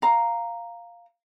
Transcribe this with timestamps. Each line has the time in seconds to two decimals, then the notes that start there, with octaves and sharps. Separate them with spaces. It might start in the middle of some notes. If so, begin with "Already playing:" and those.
0.02 F5 A#5